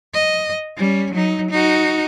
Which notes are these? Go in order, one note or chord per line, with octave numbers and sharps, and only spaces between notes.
D#5
G3 C#4
F#3 D#4
D#4 F#4